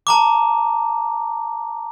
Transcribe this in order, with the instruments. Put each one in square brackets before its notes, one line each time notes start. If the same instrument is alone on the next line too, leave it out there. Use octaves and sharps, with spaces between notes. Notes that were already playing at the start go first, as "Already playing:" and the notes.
[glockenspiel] A5 A#5 D6